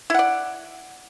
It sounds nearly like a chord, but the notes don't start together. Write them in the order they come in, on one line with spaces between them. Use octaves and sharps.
E4 F#5 D5